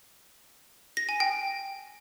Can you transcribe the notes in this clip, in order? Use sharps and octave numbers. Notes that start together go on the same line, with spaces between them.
A#6
G#5
G5